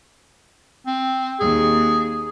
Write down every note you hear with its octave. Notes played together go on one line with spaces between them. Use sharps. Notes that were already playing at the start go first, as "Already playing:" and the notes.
C4
D#2 G#4